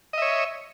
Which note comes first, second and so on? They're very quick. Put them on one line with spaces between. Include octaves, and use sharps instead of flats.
D#5 E5 C#5